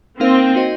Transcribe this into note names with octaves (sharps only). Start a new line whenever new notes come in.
A#3 C4 D#4 A#4 F5
C4 D#4 F#4 C5 D#5